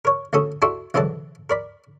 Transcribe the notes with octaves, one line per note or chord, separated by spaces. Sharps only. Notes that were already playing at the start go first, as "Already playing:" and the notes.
A#4 C#5
D2 A2 C#4 A4 D#6
D4 E4 F#4 A4 C6
C2 G#2 D3 E3 F#3 A5
A#4 D5 B5